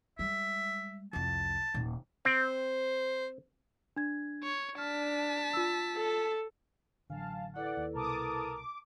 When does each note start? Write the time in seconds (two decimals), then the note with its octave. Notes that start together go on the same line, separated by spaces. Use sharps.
0.19 G3 G#3 E5
1.13 C2 F2 A5
1.74 D#1 A#2
2.25 C4 C5
3.96 D4 G#6
4.43 C#5
4.78 D4 A5 F6 B6
5.53 F4 E6
5.96 A4
7.10 A1 D3 F#3 F5 G#5 A5
7.56 E4 A4 B4 D5 F#5
7.77 D#2
7.95 C2 B2 A#4 A5 D6 D#6
8.53 D6